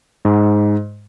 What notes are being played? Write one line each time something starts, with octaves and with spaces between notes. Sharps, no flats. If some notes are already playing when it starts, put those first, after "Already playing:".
G#2